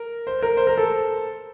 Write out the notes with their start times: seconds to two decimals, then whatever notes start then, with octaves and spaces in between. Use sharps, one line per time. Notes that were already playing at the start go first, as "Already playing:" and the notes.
Already playing: A#4
0.27 C5
0.43 A#4
0.57 C5
0.67 A#4
0.78 A4